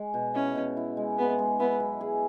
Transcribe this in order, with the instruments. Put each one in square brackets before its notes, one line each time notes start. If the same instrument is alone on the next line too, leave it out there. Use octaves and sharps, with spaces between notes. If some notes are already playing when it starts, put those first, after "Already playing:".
Already playing: [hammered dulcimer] G#3
B2
[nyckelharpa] C#4 [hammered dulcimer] E4
[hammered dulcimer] B2
E4
G#3
[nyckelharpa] B3 [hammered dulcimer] G#4
[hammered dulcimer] G#3
[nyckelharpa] B3 [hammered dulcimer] E4
[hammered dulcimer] F#3
G#4